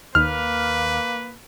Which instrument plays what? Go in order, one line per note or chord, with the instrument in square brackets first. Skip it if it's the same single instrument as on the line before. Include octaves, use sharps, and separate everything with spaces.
[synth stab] D#2 [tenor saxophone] A#3 [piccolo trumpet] B4 [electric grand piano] F6